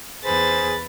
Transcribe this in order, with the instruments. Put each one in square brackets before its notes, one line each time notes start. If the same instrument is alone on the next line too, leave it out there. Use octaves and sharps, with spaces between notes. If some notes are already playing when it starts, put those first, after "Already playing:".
[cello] E2 B4 [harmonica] G#4 C5 [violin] A6